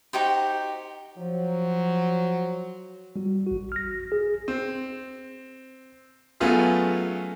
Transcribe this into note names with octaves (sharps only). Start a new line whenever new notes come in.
D#4 F#4 G4 C5
F3 F#3
G3 F#4
A1 F#4
F6 A#6
G#4
C4
F#3 A3 B3 C#4 F4 G#4